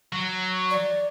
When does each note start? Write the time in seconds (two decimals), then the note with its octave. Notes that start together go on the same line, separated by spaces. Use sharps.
0.13 F#3
0.70 D5